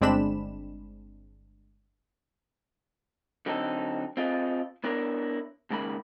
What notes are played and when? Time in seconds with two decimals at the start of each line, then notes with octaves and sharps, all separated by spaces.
0.01 G1 G#3 C4 D4 B5 E7
3.46 D3 F#3 C4 D#4 F4 A4
4.17 C4 F4 G#4 D#5
4.84 B3 D4 E4 A#4 C#5
5.70 D#2 G#2 C#3 A#3 B5